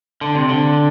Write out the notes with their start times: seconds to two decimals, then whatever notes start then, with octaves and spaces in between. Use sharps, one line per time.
0.21 D3
0.35 C3
0.49 D3